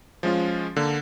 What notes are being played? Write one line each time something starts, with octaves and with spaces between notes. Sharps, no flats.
F3 G#3 C#4 F4
D3 A#3